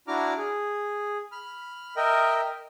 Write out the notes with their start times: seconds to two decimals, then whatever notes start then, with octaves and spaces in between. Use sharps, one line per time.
0.08 D4 E4 F#4 A#5 D6 F6
0.38 G#4
1.32 B5 F6
1.97 A#4 D#5 E5 G5